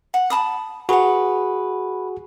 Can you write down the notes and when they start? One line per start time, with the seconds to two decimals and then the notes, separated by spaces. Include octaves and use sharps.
0.14 F#5
0.30 A5 B5 D#6
0.89 F#4 G#4 B4 F#5